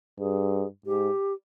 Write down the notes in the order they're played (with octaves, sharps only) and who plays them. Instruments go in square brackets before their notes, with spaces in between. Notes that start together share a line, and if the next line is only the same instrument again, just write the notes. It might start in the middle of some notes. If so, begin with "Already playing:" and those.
[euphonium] G2 [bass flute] G#4
[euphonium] G#2 [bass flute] G4